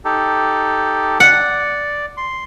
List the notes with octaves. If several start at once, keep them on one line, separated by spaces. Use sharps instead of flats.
D#4 G4 A4
D5 F#5
C6